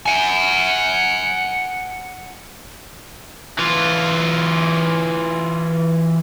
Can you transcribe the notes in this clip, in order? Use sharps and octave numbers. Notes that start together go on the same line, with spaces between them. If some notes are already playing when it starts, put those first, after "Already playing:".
F#5 G#5
E3 F4